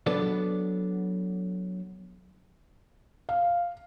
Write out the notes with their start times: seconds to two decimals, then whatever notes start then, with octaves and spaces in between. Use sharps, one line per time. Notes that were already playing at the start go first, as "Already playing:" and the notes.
0.06 F#3 B3 D4 A4 B4 D5
3.29 F5